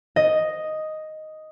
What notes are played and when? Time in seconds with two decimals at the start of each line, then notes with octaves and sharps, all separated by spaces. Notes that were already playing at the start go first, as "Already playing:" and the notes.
0.16 D#5